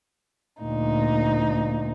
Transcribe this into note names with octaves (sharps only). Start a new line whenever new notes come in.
D2 A#2 D#4